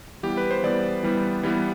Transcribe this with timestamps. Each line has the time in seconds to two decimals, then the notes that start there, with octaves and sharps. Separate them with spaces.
0.23 E3 G3 B3 G4
0.37 B4
0.51 C5
0.63 E3 G3 B3 D5
1.03 E3 G3 B3
1.43 E3 G3 B3